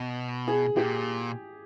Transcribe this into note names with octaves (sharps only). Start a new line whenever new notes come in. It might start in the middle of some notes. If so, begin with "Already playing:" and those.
Already playing: B2
G#4
A#2 G4